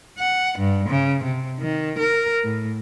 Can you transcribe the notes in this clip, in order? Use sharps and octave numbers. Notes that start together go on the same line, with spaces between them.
F#5
G2
C#3
C3
D#3
A#4
A2